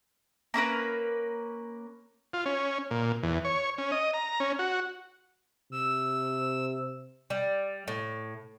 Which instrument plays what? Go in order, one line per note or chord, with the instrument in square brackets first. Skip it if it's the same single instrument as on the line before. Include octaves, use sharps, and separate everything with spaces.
[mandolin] A#3 C#4 A#4 B4
[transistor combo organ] F4
C#4
A#2
E2
C#5
C#4
D#5
A#5
C#4
F#4
[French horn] C3 [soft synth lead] E6
[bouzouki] G3
A2